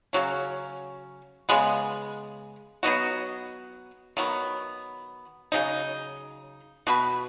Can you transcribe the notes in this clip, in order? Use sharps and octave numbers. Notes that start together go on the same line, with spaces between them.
C#3 F#3 C#4
C#3 G#3 B3
F#3 B3 D#4 F#4
D#3 F#3 B3
C#3 F#3 D#4
B2 B3 F#4 B4